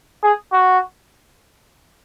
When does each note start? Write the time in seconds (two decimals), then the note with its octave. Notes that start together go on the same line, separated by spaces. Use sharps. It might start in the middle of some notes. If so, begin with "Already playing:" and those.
0.23 G#4
0.52 F#4